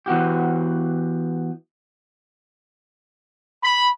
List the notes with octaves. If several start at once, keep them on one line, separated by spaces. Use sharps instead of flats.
E3 B3 F#4 G4
B5